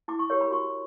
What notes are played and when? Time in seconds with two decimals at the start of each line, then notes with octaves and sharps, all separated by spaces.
0.08 E4 D6
0.19 C#6
0.30 G4 A#4 C#5 C#6
0.41 B5
0.51 F#4 C#6